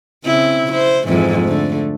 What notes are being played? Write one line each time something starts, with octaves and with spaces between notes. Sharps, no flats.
C#3 C4 E4
E4 C5
F2 G#2 E3
D3 A3